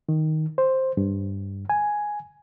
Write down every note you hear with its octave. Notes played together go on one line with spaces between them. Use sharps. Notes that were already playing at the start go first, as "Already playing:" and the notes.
D#3
C5
G2
G#5